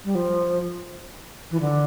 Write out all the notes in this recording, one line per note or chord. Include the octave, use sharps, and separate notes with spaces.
G3
F3
E3
D3